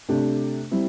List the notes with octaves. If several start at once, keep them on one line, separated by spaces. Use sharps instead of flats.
C3 A3 D4 G4
G3 C4 E4